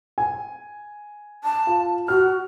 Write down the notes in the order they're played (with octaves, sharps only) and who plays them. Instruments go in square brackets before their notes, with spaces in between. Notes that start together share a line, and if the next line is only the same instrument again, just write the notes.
[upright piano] G#5
[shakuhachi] A5
[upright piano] F4
[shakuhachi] F#4 [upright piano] F6